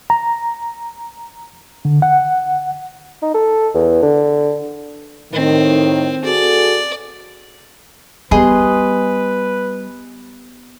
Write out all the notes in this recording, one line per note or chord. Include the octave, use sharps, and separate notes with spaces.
A#5
D3
F#5
D#4
A4
E2
D3
A2 D#3 C4
F#4 G#4 A4 D5
G3 B3 G4 G#4 B4 D#5 C6